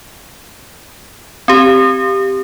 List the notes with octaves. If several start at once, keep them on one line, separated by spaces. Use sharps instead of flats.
C4 G4